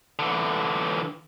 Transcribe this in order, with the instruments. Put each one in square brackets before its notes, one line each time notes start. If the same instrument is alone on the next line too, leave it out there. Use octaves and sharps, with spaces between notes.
[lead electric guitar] D3 E3